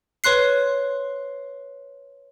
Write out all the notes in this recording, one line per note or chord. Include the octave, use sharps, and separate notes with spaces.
B4 C#5 C6 F#6 C7